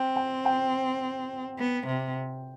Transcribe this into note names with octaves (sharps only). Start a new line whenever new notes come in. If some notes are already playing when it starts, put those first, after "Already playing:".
Already playing: C4 G5
G5
G5
B3
C3